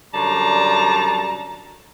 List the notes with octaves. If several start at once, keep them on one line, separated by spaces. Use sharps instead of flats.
F#2 D3 G3 A5 A#5